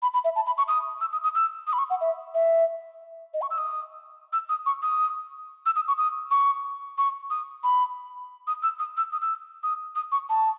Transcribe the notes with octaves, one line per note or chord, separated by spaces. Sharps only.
B5
B5
E5
A5
B5
C#6
D#6
E6
D#6
D#6
E6
D#6
B5
C#6
F#5
E5
E5
D#5
C#6
E6
D#6
E6
D#6
C#6
D#6
E6
D#6
C#6
D#6
C#6
C#6
D#6
B5
D#6
E6
D#6
E6
D#6
E6
D#6
D#6
C#6
A5